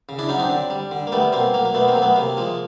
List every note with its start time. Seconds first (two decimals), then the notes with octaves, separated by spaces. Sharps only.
0.09 C#3
0.18 D4 E4
0.29 F#3 C#4 D#4
0.39 C4 D4
0.49 D3
0.70 G3
0.91 D3
1.07 A#3
1.12 G3 A3 B3
1.32 B2 A#3 C4
1.54 F#3 A#3
1.65 A#3
1.74 B2 A3 B3
1.88 A#3 C4
1.95 F#3
2.02 A3 B3
2.16 C3 A#3
2.37 F3 G#3